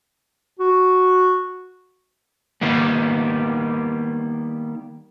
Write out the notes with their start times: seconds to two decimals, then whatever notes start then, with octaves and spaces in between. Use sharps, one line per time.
0.59 F#4
2.61 D#3 G3 A#3 B3